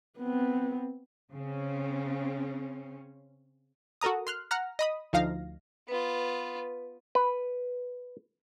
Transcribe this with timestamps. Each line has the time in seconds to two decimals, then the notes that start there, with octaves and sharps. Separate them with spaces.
0.19 B3 C4
1.32 C#3 C4 C#4
4.01 F#4 A4 A#4 A#5 D#6
4.27 C6 F6 F#6
4.51 F#5 A#5 F6 A#6
4.79 D#5 B5 D#6
5.13 D2 F3 D#4 F5 A#6
5.88 B3 F4 B4
7.15 B4